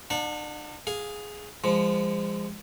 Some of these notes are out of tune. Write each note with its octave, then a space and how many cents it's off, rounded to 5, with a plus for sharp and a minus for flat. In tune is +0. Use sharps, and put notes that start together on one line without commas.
D4 +40 F#5 -35 A5 +0
G#4 +0 F5 +20
F3 -20 G#3 -35